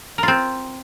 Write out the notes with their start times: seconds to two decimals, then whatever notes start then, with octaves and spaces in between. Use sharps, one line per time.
0.18 A#4
0.23 F4
0.28 C4